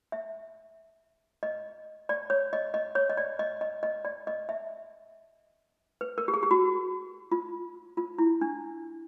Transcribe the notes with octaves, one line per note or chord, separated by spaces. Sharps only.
E5
D#5
D5
C#5
D#5
D#5
C#5
D#5
D5
D#5
D#5
D#5
D5
D#5
E5
B4
A#4
G4
G#4
G4
F#4
F4
F4
E4
D4